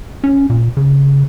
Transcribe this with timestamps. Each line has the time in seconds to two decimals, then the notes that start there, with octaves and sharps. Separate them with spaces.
0.24 C#4
0.50 A#2
0.77 C#3